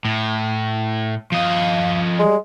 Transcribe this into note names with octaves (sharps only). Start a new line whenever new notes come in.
A2
F3 D#5 F5
G3 G#3